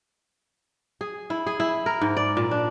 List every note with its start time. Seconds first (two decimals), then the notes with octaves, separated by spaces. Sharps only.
1.01 G#4
1.30 E4
1.47 G#4
1.60 E4
1.86 A#4
2.01 G#2
2.17 D5
2.37 A#2
2.51 D4